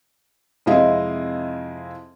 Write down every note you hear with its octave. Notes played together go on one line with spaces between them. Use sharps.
F2 C3 G#3 E4 D#5 F5